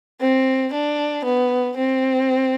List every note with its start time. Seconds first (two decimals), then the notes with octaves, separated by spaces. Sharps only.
0.20 C4
0.73 D4
1.24 B3
1.77 C4